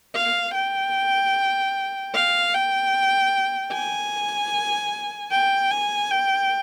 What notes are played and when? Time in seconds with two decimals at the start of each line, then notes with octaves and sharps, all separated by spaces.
0.15 F5
0.54 G5
2.14 F5
2.54 G5
3.73 G#5
5.32 G5
5.71 G#5
6.11 G5